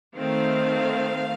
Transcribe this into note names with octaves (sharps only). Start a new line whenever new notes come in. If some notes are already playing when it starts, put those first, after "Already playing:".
D#3 A3 C4 F5